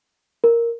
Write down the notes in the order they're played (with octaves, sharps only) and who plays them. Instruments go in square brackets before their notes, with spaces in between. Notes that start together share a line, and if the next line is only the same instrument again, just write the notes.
[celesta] A#4